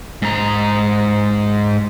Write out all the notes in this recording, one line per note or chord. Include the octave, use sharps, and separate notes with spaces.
G#2 A#5